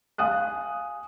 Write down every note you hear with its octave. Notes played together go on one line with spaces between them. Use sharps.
F5 G#5 D#6 F#6